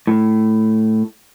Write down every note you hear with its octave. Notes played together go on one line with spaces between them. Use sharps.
A2